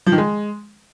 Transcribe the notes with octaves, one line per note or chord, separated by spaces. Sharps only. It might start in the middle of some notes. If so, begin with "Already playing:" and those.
F3
D#3
G#3